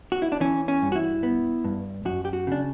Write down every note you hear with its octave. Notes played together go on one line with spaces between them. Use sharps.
F#4
E4
D4
E3 C#4
C#4
G2
F#4
E4
B3
G2
F#2 F#4
G4
F#4
C#3 D4